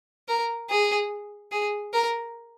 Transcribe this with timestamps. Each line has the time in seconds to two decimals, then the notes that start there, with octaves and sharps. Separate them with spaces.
0.28 A#4
0.70 G#4
1.52 G#4
1.93 A#4